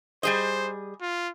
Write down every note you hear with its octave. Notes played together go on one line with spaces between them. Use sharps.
G3 G#4 C5 D#5
F4